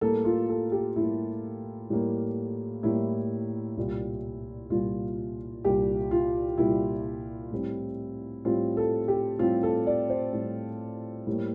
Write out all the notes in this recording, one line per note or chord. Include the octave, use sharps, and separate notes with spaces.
A2 G3 A#3 A4
F4
A4
G4
A2 G3 A#3 E4
A2 G3 A#3
A2 G3 A#3 E4
C2 A#2 G3
C2 A#2 G3 F4
C2 A#2 G3 G4
F4
C2 A#2 G3 E4
A2 G3 C4
A2 G3 C4 F4
A4
G4
A2 G3 C4 F4
A4
D5
C5
A2 G3 C4
A2 G3 A#3